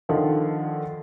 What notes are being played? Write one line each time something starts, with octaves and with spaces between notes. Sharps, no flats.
D3 D#3 F3